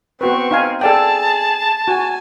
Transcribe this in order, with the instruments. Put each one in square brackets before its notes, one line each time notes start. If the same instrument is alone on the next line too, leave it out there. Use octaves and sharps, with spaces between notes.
[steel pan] B3 F#4 B4 [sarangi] C4 [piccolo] C#6
[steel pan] D#4 F5 G#5
[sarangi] G#4 [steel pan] A4 D5 G5 [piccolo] A5
[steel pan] F#4 [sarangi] G#5